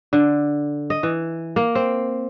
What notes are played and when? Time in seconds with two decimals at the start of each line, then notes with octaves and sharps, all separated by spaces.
0.13 D3
0.90 D#5
1.03 E3
1.56 A#3
1.75 C4